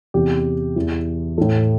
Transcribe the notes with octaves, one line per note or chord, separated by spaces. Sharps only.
E2 C3 E3 G4
E2 E3
A2 E3 A4